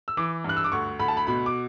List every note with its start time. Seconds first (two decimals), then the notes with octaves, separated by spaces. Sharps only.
0.08 E6
0.17 E3 D6
0.44 G2 F#6
0.57 E6
0.64 D6
0.72 D2 C#6
0.99 D2 B5
1.08 A5
1.17 B5
1.27 B2 B5
1.46 D6